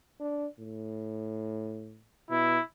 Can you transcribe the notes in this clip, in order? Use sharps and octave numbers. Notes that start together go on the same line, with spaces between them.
D4
A2
B2 E4